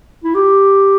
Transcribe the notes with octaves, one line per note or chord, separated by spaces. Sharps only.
E4
G4